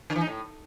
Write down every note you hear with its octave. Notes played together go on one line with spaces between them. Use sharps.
D3
E3
D#4
A2